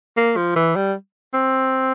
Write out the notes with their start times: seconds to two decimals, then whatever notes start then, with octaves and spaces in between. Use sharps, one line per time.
0.17 A#3
0.37 F3
0.56 E3
0.76 G3
1.34 C4